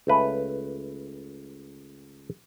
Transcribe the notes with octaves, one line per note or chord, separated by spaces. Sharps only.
C#2 A3 B4